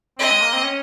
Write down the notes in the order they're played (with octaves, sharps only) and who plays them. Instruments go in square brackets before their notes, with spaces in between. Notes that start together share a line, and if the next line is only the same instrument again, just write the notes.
[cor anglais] C4 [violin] D#5
[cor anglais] G#3
A#3
C4
C#4